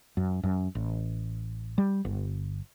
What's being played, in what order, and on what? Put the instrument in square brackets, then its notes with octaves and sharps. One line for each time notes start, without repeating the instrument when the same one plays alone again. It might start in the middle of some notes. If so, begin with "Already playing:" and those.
[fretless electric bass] F#2
F#2
A1
G3
G1